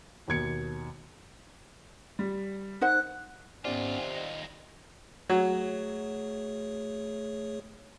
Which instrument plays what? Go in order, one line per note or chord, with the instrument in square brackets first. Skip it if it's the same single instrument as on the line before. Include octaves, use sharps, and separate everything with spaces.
[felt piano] D#2 B2 G#6 C#7
[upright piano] G3
[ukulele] D#4 C5 F#5 [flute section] F#6
[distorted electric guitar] D#2 F4 [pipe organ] G#2 B3 C#4 [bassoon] C3 [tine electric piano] D5
[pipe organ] D#5
[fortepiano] F#3 [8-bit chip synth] A3 G#4 C#5